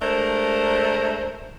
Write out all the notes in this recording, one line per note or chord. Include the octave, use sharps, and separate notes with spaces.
G#3 A3 D4 A#4 C5 E5